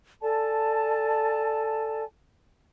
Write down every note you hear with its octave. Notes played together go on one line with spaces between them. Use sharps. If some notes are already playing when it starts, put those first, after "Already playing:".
A4 D5 G#5 A5